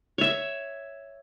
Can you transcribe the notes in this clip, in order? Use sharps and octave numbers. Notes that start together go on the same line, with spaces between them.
C#5 E5